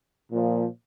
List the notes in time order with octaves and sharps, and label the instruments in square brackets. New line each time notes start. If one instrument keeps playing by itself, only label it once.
[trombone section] A#2 F3